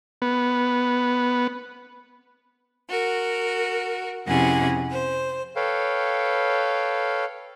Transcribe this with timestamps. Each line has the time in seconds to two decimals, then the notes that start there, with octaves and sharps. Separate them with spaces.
0.22 B3
2.89 F#4 A#4
4.26 F2 C3 C#4 E4 G#4 F#5
4.89 C5
5.56 A4 B4 C#5 F5 G5